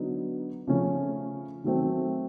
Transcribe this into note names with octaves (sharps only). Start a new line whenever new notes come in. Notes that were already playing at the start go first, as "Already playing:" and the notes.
Already playing: D3 F#3 B3 D#4
C#3 F3 A3 C#4
D#3 F#3 A3 C4